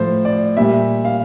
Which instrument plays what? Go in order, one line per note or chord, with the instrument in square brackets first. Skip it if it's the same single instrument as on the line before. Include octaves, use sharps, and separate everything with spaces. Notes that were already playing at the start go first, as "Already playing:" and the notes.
Already playing: [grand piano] A2 F3 C5
D5
A#2 G3 E5
F5